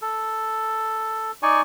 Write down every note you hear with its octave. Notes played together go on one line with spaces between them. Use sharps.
A4
D#4 D5 G#5 C#6